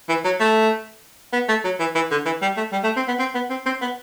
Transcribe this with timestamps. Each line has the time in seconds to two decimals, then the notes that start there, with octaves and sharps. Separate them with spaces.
0.09 E3
0.24 F#3
0.40 A3
1.33 B3
1.49 A3
1.64 F#3
1.79 E3
1.95 E3
2.11 D3
2.26 E3
2.42 G3
2.57 A3
2.72 G3
2.84 A3
2.96 C4
3.08 B3
3.19 C4
3.35 B3
3.50 C4
3.66 C4
3.81 B3